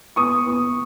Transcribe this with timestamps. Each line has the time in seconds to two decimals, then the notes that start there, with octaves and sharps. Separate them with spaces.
0.16 B3 C#6 D#6
0.46 B3